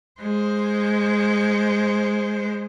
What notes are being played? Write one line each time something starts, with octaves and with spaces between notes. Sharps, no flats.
G#3 C5